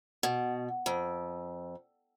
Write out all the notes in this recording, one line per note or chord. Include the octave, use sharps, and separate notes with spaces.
B2
F2